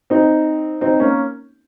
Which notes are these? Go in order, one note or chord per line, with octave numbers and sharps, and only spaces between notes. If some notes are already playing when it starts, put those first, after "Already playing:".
C4 D#4
C4 D#4
A#3 C#4